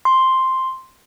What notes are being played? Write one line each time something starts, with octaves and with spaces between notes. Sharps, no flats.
C6